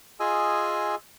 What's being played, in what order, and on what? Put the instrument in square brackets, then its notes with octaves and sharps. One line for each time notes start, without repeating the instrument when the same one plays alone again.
[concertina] F4 G#4 D#5 G#5 E6